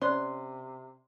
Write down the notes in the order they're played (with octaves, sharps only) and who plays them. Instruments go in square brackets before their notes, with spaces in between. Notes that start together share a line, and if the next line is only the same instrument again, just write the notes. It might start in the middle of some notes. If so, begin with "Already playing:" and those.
[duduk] C3 [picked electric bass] C#4 [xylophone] C5 D5 F#6 [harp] C6